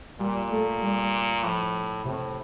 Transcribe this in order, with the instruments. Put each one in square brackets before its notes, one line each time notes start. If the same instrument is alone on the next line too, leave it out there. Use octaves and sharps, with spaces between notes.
[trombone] A#2 [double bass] G3
[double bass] A3
G3
[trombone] A2 [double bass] F3
[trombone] A2 [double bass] C3